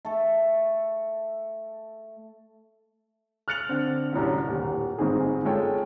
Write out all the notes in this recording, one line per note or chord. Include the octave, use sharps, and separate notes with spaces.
A3 A4
F6 F#6 A6 C#7 F7 F#7
D3 C4
C2 F#2 A2 D3
D#1
G1 G#2 C4 D#4 G#4
G#3 F4 A4 C#5 G5